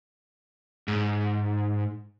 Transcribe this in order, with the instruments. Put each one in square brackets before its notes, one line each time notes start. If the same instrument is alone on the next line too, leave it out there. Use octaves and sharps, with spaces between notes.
[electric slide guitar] G#2